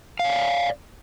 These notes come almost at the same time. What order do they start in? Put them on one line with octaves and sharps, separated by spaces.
F5 C#5 D5